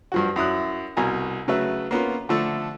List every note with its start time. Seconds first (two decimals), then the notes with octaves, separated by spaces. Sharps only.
0.12 G2 F3 F#4
0.36 F#2 E4 D#6 F#6
0.97 C2 B2 G#5 A#5
1.48 C#3 F#3 A3 B4 E5
1.91 A#3 B3 C#4 F4
2.29 D3 F3 A3 A4